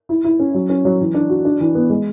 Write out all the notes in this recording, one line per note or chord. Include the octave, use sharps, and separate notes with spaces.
E4
E4
C#4
F#3
C#4
F#3
E3
D4
F#4
D4
E3
B3
G#3